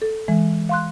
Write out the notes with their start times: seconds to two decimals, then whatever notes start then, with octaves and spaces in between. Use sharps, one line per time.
0.02 A4
0.28 E3 G#3
0.69 F5 C6 F#6